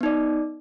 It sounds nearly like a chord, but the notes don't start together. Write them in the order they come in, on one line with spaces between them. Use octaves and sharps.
B3 D#4 D5